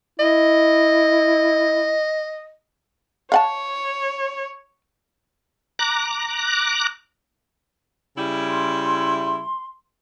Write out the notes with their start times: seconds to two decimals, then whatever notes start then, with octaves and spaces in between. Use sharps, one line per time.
0.20 E4 D#5
3.32 C#5 F5 F#5 A5
5.79 A#5 D6 F#6
8.17 C#3 G3 E4
8.49 C6